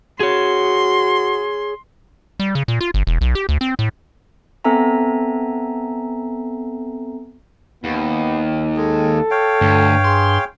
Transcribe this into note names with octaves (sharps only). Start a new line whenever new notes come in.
F#4 G#4 C#5 C6
G3
C#3
A#2
F4
G1
E1
B1
G4
D2
C4
A2
B3 C4 A4 E5 G#5 A#5
D#2 B3
G#3 A4
C#5 F5 G5
D2 G2
G#4 C6